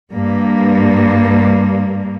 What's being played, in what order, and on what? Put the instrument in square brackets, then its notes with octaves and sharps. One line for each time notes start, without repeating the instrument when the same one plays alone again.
[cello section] G2 A#3